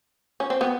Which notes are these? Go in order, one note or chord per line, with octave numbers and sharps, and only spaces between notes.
C#4
C4
B3